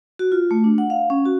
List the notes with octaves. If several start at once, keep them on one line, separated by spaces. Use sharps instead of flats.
F#4
F4
A3
D4
F#5
F5
C#4
F#4